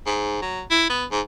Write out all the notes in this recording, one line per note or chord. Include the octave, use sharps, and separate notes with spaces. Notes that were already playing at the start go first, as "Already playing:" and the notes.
G#2
F#3
E4
B3
G#2